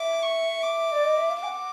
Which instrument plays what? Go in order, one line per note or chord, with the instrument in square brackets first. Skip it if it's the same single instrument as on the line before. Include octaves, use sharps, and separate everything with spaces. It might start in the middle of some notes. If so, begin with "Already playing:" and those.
Already playing: [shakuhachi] E5 [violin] D6
[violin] C#6
D6
[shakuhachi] D5
D#5
E5
F5
[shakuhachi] G#5 [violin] D6
[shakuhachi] F#5